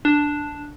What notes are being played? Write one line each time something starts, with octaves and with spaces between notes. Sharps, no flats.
D4